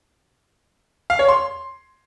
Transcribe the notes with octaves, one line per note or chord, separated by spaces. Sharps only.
F5
C#5
C6